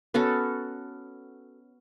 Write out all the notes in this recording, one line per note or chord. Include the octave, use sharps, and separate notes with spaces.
B3 C#4 F#4 A4